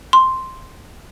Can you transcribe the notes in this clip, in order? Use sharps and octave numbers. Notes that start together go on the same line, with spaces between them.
C6